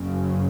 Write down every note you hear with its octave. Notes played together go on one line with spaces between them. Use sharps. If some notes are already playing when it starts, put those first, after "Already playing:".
Already playing: F#1 F#2 C#3